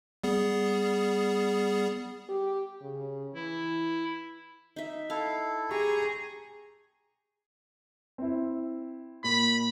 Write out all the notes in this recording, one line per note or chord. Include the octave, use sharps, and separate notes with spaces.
G3 B3 G#4
G4
C#3
E3 E4
D#4 E5
E4 A4 F5
G4 G#4 A#5 C#6
C4 E4
A#2 B5